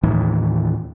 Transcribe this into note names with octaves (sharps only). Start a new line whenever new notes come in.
D#2 A2 D#3 E3